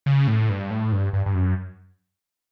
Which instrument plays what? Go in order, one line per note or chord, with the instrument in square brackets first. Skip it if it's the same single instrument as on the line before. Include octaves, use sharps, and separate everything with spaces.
[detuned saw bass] C#3
A2
G2
A2
G2
G2
G2
F#2